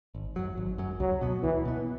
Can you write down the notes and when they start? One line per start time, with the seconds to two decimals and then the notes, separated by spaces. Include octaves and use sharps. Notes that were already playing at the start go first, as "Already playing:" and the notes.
0.15 G#1
0.36 F#2 F#3
0.58 G#1
0.78 F#2 F#3
1.00 C#2 F#3
1.21 B2 B3
1.43 C#2 E3
1.65 B2 B3